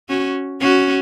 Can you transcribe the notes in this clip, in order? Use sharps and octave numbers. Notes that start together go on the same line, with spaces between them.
C#4 F#4
C#4 F#4